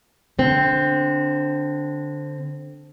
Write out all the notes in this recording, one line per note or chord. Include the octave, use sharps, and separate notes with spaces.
D3 C4